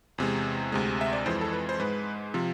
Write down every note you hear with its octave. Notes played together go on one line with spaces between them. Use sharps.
E2 C3 G#3
D2 C3 G#3
E5
D5
F2 E3 G#3 C5
A4
B4
C5
G#2 G#3 B4
C3 F3